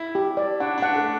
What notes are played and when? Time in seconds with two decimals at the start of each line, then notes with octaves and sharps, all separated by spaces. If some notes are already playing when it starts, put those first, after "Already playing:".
Already playing: E4
0.15 G4
0.37 D5
0.60 D4 F#5
0.78 D4
0.82 F#5
0.94 A3